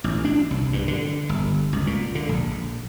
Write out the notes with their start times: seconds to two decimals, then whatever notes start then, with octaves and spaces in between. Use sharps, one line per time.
0.04 A1
0.25 D4
0.51 C2
0.73 G2
0.88 D3
1.29 G1
1.73 C#2
1.87 A#2
2.15 D3
2.29 A#1